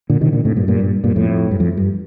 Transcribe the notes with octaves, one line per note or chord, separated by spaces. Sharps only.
A#2 D3
C3 D#3
A#2 D3
A2 C3
G2 A#2
G2 A#2
G2
G2 A#2
F2 A2
G2
F2
G2